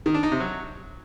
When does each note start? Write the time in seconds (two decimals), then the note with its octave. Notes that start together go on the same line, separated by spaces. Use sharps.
0.06 D#3
0.14 D4
0.23 D#4
0.32 C3
0.40 F#3